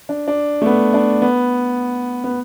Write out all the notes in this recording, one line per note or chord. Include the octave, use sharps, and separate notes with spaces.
D4
D4
A3
B3
D4
B3
B3